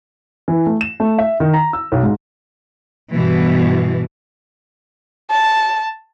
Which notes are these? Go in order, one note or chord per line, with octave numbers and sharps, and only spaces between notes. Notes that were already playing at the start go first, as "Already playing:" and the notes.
E3
A3
E7
A3
E5
D#3
A#5
E6
B1
G#2
G2 B2 E3
A5